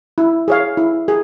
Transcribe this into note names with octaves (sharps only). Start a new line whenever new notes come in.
E4
G#4 C#5 F5
E4
G#4